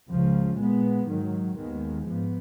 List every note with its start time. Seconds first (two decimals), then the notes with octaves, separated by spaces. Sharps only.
0.10 C#2 C#3 F3
0.58 A#2 G#3 B3
1.08 G#2 D#3 F#3
1.58 D#2 D#3 G#3 B3
2.07 G#2 F3 B3